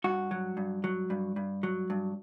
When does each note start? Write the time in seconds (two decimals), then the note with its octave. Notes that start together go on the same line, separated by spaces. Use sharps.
0.04 G2 F#4
0.31 F#3
0.57 G2
0.84 F#3
1.10 G2
1.36 G2
1.63 F#3
1.90 G2